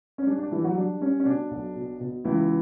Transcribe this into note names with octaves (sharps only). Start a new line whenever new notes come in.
C#4
G3 D4
D4
E3 G3 E4
F#3 F#4
G3 D4
G3 C#4
C#4
B2 D4
B1
B2
B2
C#2 E3 E4